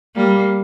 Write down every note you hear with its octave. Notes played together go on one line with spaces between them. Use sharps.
G3 A#3